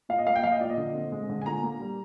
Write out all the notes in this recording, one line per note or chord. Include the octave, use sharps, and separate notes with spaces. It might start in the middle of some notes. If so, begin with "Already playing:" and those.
A#2 F5
D#5
A#3 F5
G5
F3 F5
D#5
A#2 D5
D#5
D3
C4
G#3
D3
G#5
A#2 A#5
A#3
G3